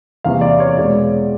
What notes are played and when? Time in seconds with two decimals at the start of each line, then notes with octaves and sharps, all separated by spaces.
0.24 E2 C3 E3 G3 A#3 F5
0.41 D5
0.60 C#5
0.77 E2 B2 G#3 D5